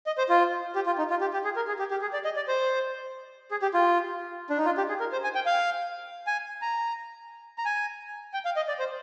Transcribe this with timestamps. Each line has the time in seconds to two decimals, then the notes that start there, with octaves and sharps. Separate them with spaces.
0.07 D#5
0.18 C5
0.29 F4
0.75 G4
0.86 F4
0.98 D#4
1.10 F4
1.21 G4
1.33 G4
1.44 G#4
1.56 A#4
1.68 G#4
1.79 G4
1.91 G4
2.02 G#4
2.13 D5
2.25 D#5
2.36 D5
2.48 C5
3.51 G#4
3.62 G4
3.74 F4
4.50 D4
4.58 D#4
4.65 F4
4.77 G4
4.89 G#4
5.00 A#4
5.12 C5
5.24 G#5
5.35 G5
5.46 F5
6.27 G#5
6.62 A#5
7.58 A#5
7.65 G#5
8.34 G5
8.45 F5
8.56 D#5
8.68 D5
8.79 C5